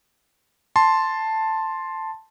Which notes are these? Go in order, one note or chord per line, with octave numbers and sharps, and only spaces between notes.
A5 C6